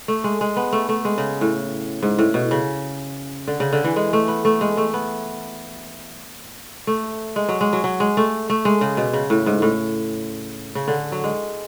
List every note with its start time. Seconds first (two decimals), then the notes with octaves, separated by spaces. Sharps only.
0.08 A3
0.24 G#3
0.41 G#3
0.57 B3
0.73 A3
0.89 A3
1.05 G#3
1.18 C#3
1.41 A2
2.03 G#2
2.19 A2
2.34 B2
2.51 C#3
3.48 D3
3.60 C#3
3.73 D3
3.84 E3
3.96 G#3
4.13 A3
4.28 B3
4.45 A3
4.61 G#3
4.77 A3
4.94 B3
6.87 A3
7.36 G#3
7.49 F#3
7.61 G#3
7.73 F#3
7.84 F#3
8.00 G#3
8.17 A3
8.50 A3
8.65 G#3
8.81 C#3
8.97 B2
9.13 C#3
9.30 A2
9.46 G#2
9.62 A2
10.75 C#3
10.88 D3
11.12 F#3
11.24 G#3